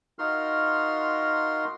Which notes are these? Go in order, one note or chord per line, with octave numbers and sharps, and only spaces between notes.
D#4 F4 F#4 A#4 C6 F6